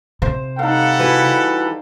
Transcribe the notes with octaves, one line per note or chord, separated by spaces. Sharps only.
C3 C5
G3 D#4 A4 F5 F#5
E3 F#4 B4